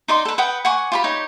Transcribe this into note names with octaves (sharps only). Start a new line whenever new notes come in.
D#4 D5 D#5 C6
A4 B4
B4 F#5 G5 D#6
F#5 G#5 C#6 D6
F4 G4 B5
D#4 G4 C#5